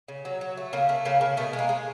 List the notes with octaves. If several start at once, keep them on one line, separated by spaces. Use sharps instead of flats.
C#3
F#3
F#3
A3
C#3 A#3
A3
C#3 A#3
C#3 A#3
B2 A3
G#3
A#3
G#3